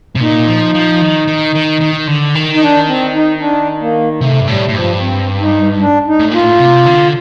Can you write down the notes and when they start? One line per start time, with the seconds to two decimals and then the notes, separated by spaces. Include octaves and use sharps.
0.16 C3
0.21 A#2 D#4
0.48 F3
0.75 F3
1.02 D#3
1.28 D#3
1.55 D#3
1.82 D#3
2.08 D3
2.35 D#3
2.54 D#4
2.61 D4
2.88 C4
3.14 D#4
3.40 D4
3.81 A#3
4.20 C3 A3
4.41 G2
4.47 A2 G3
4.69 A2
4.73 G2 F3
5.00 C4
5.40 D#4
5.80 D4
6.07 D#4
6.20 A2
6.32 A#2 F4
6.43 A2
6.60 C3
6.86 D3